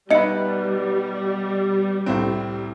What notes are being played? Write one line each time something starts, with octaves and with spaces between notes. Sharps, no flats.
B2 G3 D#4 B4 D#5 E5 C#7
C2 A2 C4